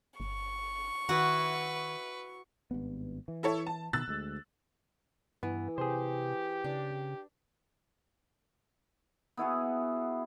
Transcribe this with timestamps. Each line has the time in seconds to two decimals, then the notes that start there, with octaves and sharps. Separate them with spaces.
0.20 G1 C#6
1.09 D#3 E4 F#4 B4
2.71 G#1 G2 B3
3.28 E3
3.43 E4 A4 C#5
3.67 A5
3.93 B2 D#3 E6 F#6 A6
4.08 D2 G#3
5.43 G2 E3 B3
5.78 C3 G4 G#4 C5
6.64 C#3 D4
9.37 B3 E4 F#4 G#4